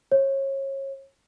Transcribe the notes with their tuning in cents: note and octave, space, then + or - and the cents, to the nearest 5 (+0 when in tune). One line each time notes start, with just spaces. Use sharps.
C#5 -30